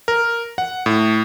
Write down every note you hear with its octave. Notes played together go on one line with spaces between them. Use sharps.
A#4
F#5
A2